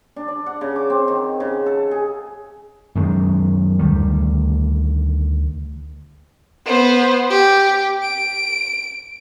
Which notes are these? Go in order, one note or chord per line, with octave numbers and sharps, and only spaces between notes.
D4
D5
F#5
C#3
D6
C4
D#3
C#3
A4
G#4
F#2 D#3 G#3
D2 D#3 G3
B3 C5
G4
D7